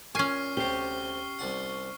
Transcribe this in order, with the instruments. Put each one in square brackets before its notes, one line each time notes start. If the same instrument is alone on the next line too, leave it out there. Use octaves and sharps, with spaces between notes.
[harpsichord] A#2 [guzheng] C#4 G#5 [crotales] C#6 F6 C7
[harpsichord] D2 C3 [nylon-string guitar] G4 [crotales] C7 G7
[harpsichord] C2 D4 F#5